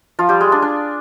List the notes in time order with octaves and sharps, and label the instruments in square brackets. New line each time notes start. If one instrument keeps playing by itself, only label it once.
[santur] F3 F4
G3 G4
G#3 G#4
D4
D4